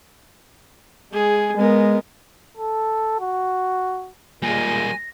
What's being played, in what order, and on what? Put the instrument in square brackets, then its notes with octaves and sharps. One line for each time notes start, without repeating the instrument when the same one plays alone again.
[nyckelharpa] G#3 G#4
[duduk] G#3 [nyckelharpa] B3 A#4
[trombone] A4
F#4
[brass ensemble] A#2 G#3 [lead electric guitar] G3 A#3 [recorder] G#5 [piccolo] A#6